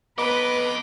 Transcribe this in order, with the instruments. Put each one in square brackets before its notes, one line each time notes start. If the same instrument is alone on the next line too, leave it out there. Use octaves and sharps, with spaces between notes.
[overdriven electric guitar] F2 D#5 [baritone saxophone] B3 [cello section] B4 [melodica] D6